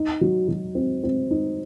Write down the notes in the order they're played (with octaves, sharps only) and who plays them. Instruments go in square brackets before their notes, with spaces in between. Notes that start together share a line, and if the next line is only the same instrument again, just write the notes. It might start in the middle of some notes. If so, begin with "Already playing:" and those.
Already playing: [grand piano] D#4
F#3
F#3
C4
C4
D#4